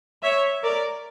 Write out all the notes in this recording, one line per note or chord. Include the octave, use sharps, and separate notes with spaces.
C#5 E5
A#4 D5